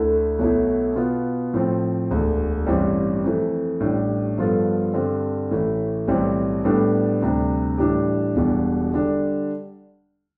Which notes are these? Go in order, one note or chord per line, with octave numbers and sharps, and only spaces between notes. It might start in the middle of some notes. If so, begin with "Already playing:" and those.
Already playing: D2 D3 A3 E4 A4
B1 B2 A3 E4
B2 B3 F4
A2 F3 C4
E1 D2 D3
A1 G2 E3 G3 C4
F2 E3 A3
A1 A2 G3 D4
G2 F3 B3 F4 A4
G2 D3 G3 C4
A1 A2 E3 A3 E4
B1 A2 E3 G3 C4
A2 G3 B3 D4 A4
D2 C3 G3 D4
A2 E3 G3 D4 G4
E1 E2 B2 G3 D4
D3 G3 D4